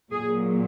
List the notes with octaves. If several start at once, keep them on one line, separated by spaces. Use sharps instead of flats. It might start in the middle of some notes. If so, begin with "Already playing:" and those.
A#2 F#3 G#4